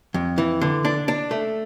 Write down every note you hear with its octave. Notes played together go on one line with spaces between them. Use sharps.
F2
E3
D3
D4
D4
A3